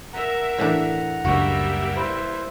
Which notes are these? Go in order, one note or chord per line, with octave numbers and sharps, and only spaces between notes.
A#4 E5 F#5 A#5
A2 E3 D4
F#1 C#2 G3 A#3 D4 F#4 E5
E4 B4 C5